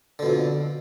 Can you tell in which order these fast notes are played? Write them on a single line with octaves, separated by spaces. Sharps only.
D3 B2 F2